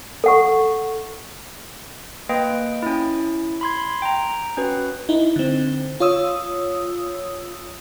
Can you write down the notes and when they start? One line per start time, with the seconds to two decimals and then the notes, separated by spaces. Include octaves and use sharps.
0.24 A4 F#5 C#6
2.29 A#3 B4 D#5 G5
2.83 C#4 E4
3.61 B5 C6 G#6
4.02 G5 A#5
4.57 C#4 F#4 B4
5.09 D#4 E4
5.36 D3 C4
6.00 F4 C#5 D#6 E6